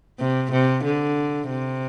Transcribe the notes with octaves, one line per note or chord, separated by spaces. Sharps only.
C3
C3
D3
C3